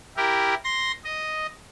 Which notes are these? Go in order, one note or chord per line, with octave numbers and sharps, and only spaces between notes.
E4 G4 A#4
C6 A#6
D#5